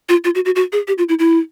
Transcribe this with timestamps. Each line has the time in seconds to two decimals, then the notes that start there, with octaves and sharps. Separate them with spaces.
0.09 F4
0.25 F4
0.35 F#4
0.45 F#4
0.56 F#4
0.72 G#4
0.88 G4
0.98 F4
1.09 E4
1.19 E4